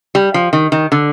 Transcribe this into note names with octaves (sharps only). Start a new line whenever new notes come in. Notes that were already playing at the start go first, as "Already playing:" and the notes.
G3
F3
D#3
D#3
D3